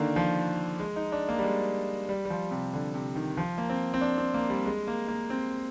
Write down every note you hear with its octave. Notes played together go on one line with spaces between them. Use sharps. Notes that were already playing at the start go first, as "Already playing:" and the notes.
Already playing: D3 D#3 A#3 D4
F3
G#3
D#4
D4
A#3
G3
G#3
G3
G3
F3
C3
D3
C3
D#3
F3
A#3
C4
C4
D4
C4
A#3
G3
G#3
A#3
A#3
C4